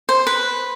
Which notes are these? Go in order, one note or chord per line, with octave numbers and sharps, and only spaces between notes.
C5
B4